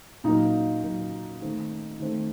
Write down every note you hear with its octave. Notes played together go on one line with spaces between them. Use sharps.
A#2 F#3 A#3 D#4
A#2 F#3 A#3
D#3 A3 C4
D#3 A3 C4